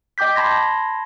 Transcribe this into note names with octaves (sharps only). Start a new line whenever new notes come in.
D#5 G5 D6 G6 B6
A5 B5 C6 G#6 A#6